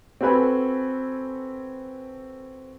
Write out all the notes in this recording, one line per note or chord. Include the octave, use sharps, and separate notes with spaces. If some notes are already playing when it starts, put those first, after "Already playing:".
C4 F#4 A4 B4 G#5 B5